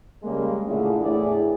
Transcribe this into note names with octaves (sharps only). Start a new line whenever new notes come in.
C#3 G3 G#3 A#3
A#2 D3 A3 E4 G#4
E2 A2 E3 E4 G#4 D5